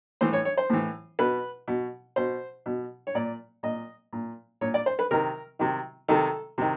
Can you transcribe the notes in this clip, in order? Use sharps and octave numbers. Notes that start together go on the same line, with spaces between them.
A2 E3 C5
C#5
C#5
C5
A2 E3
B2 B4
B2
B2 C5
B2
C#5
A#2 D5
A#2 D#5
A#2
A#2 C#5
D5
C5
B4
C3 D#3 A#4
C3 D#3
C3 D#3 A4
C3 D#3